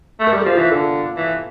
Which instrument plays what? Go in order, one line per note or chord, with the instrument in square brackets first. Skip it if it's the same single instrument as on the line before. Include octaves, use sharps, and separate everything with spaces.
[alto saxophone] A3
[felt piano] A#4
[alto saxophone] G3
[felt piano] A4
[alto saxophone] F3
[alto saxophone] E3 [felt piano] F4
[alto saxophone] D3 [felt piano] A4
[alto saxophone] E3